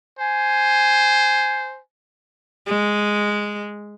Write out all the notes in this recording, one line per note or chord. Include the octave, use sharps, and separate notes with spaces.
C5 G#5
G#3